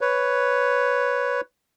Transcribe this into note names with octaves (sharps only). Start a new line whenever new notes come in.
B4 C#5